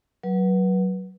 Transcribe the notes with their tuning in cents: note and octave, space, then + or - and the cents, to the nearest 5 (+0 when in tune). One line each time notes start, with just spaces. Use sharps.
F#3 +10 B4 -25